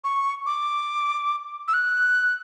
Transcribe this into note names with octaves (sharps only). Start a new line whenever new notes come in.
C#6
D6
E6
F#6